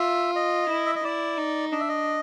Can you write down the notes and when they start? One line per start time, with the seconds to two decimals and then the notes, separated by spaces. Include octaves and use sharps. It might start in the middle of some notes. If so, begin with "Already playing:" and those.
Already playing: F4 E5
0.36 D#5
0.70 E4
0.86 E5
0.95 D#5
1.04 E4 D5
1.38 D#4
1.72 D4 D#5
1.80 E5
1.89 D#5